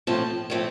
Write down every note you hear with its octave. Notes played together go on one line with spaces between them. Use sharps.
A2 F3 A3 C4 A5
A2 F3 A3 C4